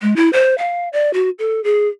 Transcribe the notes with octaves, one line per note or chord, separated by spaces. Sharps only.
G#3
E4
C5
F5
D5
F#4
A4
G#4